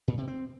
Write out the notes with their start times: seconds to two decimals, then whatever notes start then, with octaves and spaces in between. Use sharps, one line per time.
0.08 A#2
0.18 C3
0.28 C4